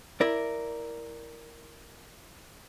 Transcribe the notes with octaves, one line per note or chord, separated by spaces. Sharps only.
E4 A#4 D5